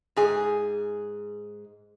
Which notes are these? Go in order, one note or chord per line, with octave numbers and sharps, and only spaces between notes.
G#2 G#4